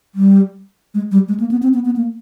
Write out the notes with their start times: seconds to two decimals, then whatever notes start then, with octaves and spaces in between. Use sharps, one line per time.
0.15 G3
0.94 G#3
1.12 G3
1.28 G#3
1.40 A#3
1.51 B3
1.63 C4
1.74 B3
1.85 B3
1.96 A#3